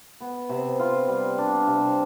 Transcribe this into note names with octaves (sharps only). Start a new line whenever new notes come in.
B3
C3
F4
G3
D4
C3